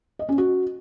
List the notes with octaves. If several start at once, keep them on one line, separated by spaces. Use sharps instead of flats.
D#5
C#4
F#4